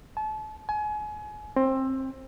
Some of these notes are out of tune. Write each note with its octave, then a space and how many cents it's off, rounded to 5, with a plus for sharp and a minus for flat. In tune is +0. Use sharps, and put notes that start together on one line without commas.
A5 -35
G#5 +30
C4 +20